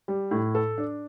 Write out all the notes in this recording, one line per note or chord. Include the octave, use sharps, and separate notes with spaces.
G3
A2
A4
D4